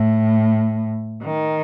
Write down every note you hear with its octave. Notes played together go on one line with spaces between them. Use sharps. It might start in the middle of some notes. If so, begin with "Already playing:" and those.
Already playing: A2
D#3